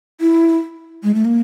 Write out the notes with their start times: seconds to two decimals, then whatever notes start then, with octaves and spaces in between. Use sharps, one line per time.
0.21 E4
1.03 G#3
1.15 A3
1.25 A#3